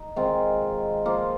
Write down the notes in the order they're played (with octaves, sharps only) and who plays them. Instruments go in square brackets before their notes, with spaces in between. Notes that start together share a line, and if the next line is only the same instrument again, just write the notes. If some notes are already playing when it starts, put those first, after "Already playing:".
Already playing: [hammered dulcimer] D#4
D#3 G#3 C4 F4
F3 A#3 F4